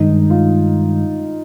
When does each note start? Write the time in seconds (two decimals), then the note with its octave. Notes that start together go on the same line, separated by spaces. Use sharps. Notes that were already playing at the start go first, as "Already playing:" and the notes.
Already playing: G2 D#3 G#3 D#4
0.30 F4